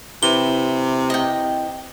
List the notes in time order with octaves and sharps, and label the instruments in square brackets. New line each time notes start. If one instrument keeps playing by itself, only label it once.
[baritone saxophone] C3 [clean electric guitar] E4 B4 [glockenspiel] G7
[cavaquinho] D#5 G5